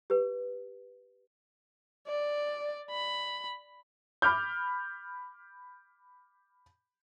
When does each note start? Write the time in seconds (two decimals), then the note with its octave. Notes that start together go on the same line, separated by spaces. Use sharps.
0.10 G4 B4
2.07 D5
2.90 B5
4.22 B5 D6 F6 G6